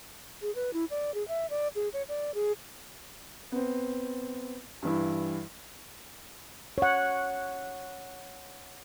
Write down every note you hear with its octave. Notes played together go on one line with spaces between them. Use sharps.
G#4
B4
E4
D5
G#4
E5
D5
G#4
C#5
D5
G#4
B3 C4
G2 E3 E4
C#5 F#5